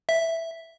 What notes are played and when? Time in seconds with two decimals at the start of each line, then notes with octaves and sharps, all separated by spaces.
0.09 E5